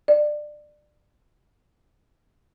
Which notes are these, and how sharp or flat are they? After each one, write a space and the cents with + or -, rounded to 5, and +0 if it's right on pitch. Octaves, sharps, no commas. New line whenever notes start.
D5 +20